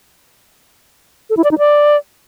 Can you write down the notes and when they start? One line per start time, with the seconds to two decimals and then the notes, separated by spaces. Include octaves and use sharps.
1.30 A4
1.37 E4
1.44 D5
1.51 D#4
1.58 D5